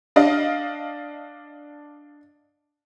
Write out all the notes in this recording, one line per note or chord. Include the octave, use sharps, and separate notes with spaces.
D4 D#5 F5